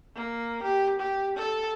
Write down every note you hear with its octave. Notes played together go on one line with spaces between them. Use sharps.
A#3
G4
G4
A4